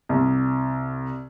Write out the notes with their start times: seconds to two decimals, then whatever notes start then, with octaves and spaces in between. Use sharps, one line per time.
0.09 C2